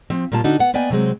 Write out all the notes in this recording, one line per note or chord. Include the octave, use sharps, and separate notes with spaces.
F3 C4
A#2 G3 A#3 F4 A5
D3 D4 D#4 F#4
B3 F#5
A#3 B3 D5 D#5 G5 G#5
C3 F#3 G#3 C4